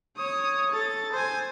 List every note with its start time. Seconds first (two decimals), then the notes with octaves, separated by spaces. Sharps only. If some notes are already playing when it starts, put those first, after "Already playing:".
0.17 C#5 D#6
0.72 A4 A6
1.12 C5 G#5